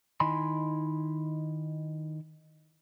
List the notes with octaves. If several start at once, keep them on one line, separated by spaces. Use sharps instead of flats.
D#3 D#4 E4 G#5 B5 C6